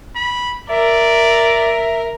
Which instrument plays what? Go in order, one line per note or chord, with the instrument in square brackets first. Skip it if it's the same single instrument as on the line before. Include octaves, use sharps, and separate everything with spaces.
[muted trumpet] B5
[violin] A#4 [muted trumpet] D5 [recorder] E5